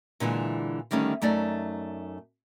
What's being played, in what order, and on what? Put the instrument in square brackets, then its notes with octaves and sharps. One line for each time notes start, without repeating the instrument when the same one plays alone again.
[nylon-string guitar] A#2 D3 E3 G#3
D3 D#3 G3 A3 C#4
F#2 A3 D#4 D5